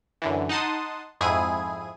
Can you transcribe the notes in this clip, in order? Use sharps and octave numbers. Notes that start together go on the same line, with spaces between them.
F#2 D3 E3
D#4 F#5 A5 C6 D#6
F2 G#2 E4 G#4 G#5 D#7